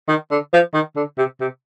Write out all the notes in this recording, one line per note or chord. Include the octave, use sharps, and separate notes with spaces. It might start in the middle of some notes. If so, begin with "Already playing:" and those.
D#3
D3
F3
D#3
D3
C3
C3